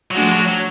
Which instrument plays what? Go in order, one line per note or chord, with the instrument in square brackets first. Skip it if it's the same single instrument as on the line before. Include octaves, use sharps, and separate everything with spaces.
[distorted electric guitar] F#3
[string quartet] F3 A3 D4 F#4 [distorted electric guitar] G#3
[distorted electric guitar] F#3
F#3